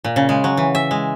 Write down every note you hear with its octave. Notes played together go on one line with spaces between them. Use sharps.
A#2
C#3
G#3
F#3
E3
E5
G#3